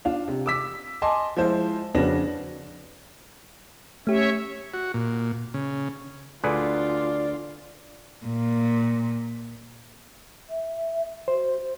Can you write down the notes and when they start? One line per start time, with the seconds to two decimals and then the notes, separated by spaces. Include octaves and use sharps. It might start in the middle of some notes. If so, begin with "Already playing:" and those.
0.05 D4 F4 F5
0.28 C3
0.46 D6 E6 B6
1.02 D#5 G#5 A5 C6 D6
1.37 F3 G#3 E4 F4 C5
1.95 F2 C#3 D4 F#4 B4 A#6
4.07 A3 C#4 G4 C#5 E5
4.74 F#4
4.94 A#2
5.54 C#3
6.44 D2 D3 F4 G#4 B4 D5
8.26 A#2
10.49 E5
11.28 F#4 C5